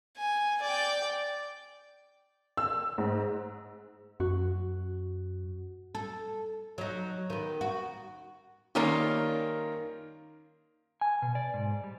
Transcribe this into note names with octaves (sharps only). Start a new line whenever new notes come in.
G#5
D5 G5
E6
G#2
F#2 F#4
A4
F#3 D#4
D#3 B3
F#4
D#3 G3 A#3 C#4 F4 A#4
G#5
B2
D5
G#2
G3